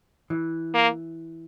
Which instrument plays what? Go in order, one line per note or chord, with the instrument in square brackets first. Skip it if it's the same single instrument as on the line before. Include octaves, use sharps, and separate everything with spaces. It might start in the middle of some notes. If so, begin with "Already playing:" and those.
[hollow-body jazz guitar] E3
[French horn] A#3